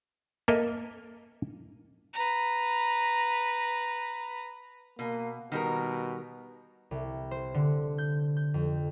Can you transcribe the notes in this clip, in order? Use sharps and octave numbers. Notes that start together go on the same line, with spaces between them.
A#3 A4 A#4 D#5 E5
B4 A#5
B2 A#3
B2 D#3 G3 A#4
C2
C5
D3
G6
G6
F2